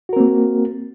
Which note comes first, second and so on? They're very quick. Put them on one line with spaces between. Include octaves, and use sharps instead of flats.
F#4 A#4 C4 A#3